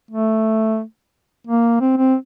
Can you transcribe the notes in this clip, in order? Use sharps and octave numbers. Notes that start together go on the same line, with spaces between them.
A3
A#3
C4
C4